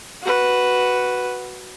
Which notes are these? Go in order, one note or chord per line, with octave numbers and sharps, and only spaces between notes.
F#4 B4